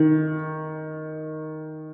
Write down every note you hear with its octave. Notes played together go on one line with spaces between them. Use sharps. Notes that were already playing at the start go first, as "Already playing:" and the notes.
Already playing: D#3